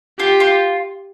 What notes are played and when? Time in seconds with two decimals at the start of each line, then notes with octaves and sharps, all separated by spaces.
0.20 F4 G4
0.40 F4